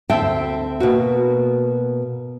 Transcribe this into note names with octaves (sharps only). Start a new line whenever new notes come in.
D2 C4 E5 G5 A5
B2 A#3 F#4